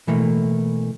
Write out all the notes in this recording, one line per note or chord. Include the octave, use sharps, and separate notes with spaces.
B2 E3 A3 A#3